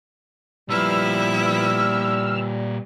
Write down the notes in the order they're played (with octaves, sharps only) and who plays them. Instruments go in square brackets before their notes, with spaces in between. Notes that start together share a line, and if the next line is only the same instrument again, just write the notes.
[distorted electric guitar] A#2 B4 [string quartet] F3 B3 E4 [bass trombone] G3 [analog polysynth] E6 F6